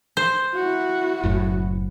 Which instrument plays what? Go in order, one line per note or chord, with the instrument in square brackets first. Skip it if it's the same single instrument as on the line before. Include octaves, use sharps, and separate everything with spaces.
[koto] C5
[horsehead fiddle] E4 F#4
[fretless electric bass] F#1 F#2 A2